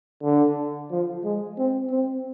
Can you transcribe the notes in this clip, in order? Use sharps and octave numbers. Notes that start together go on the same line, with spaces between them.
D3
F3
G#3
C4
C4